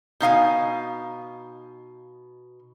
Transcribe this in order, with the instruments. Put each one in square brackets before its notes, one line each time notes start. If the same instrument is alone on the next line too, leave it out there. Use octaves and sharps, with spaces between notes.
[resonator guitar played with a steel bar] B2 D#4 F5 G#5